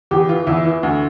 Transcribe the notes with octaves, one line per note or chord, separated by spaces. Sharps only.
E2 G4
E3 F4
E2 E4
E3
D2